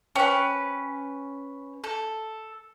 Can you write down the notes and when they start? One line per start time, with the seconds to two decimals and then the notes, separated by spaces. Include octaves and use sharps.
0.15 C#4 B4 C5 G5 A5
1.84 A4